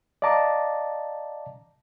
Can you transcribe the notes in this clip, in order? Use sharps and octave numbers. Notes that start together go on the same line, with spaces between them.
D5 D#5 F5 A5 A#5 D6